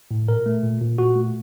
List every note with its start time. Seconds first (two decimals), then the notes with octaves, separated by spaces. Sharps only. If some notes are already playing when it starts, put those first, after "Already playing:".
0.11 A2
0.28 A#2 A#4
0.46 A3
0.63 A#2
0.81 A#2
0.98 A#2 F#4
1.16 A3